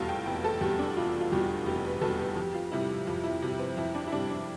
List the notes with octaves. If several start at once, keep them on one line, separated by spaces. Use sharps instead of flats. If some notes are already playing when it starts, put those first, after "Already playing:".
Already playing: F1 E2 B2 G3 F4 A4 F5
G5
F1 G5
A4
E2 B2 G3 G4
D4
F1 F4
F4
E2 B2 G3 G4
F1 G4
B4
E2 B2 G3 A4
G4
F2 G4
F4
C3 G3 E4
F2 F4
E4
C3 G3
C4
F2 E4
D4
E4
C3 G3 D4
D4